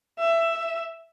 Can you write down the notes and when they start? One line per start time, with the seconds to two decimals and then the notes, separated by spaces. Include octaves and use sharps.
0.19 E5